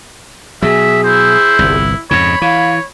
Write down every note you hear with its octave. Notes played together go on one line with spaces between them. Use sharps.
B2 F#3 G#4 E5
E4 C5
G1 C2
F2 G#2 C#3 C#5 B5
E3 C#5 F5